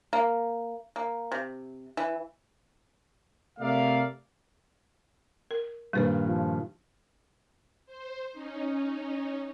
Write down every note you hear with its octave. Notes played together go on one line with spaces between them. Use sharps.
A#3
A#3
C3
E3
C3 A3 A#4 D5 E5 F5
A#4
G2 A#2 D#3 G3 B4 C5
F3
C5
C#4 D#4